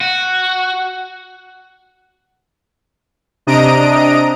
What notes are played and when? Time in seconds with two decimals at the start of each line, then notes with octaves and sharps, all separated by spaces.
0.01 F#4
3.47 C3 D4 D#5 A#5 D#6 D7